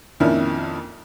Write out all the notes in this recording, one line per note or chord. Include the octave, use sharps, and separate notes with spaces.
F2 A#2 D#3 C#4 D4 E4